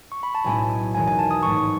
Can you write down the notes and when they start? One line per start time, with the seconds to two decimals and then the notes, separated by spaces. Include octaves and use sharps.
0.12 C#6
0.23 B5
0.35 A5
0.44 B1 A2 G#3 C#4 E4 G#5
0.95 E1 E2 D#3 G#3 G#5
1.08 G#5
1.19 A5
1.31 D#6
1.43 A1 G#2 F#3 A3 C#6